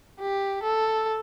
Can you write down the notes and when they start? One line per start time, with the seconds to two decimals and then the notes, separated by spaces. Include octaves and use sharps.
0.20 G4
0.63 A4